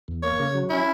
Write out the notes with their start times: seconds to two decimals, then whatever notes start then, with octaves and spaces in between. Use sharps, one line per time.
0.08 E2
0.23 A#3 C#5
0.39 C#3
0.54 F#3
0.70 C#4 E4